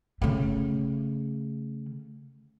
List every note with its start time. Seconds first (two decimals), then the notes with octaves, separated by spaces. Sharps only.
0.22 C#3 A3